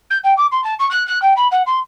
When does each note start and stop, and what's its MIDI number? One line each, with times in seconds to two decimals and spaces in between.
0.10 0.18 91
0.23 0.34 79
0.37 0.46 86
0.51 0.63 84
0.64 0.74 81
0.79 0.89 85
0.90 1.05 90
1.07 1.21 90
1.22 1.33 79
1.36 1.48 83
1.51 1.62 78
1.66 1.79 84